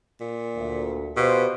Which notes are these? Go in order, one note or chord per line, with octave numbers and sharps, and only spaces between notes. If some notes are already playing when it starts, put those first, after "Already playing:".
A#2
D2
B2 F4 G4 C5